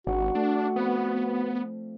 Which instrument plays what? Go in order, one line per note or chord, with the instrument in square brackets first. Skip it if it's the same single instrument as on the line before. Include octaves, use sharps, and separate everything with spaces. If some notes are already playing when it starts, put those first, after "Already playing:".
[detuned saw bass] G#1 [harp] D4 [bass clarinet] F#4
[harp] A3 A4 [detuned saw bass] D4
[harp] F3 C4 [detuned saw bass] B3